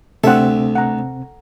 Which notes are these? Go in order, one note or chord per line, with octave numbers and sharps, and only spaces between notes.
D2 C3 C4 A4 E5 F#5
F#5 A#5